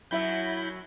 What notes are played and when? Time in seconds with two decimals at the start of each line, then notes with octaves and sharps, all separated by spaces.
0.11 F#2 F#3 E4 E5 B5 G6